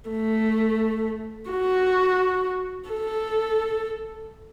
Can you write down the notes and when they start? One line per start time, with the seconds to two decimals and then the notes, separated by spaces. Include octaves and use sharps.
0.10 A3
1.50 F#4
2.90 A4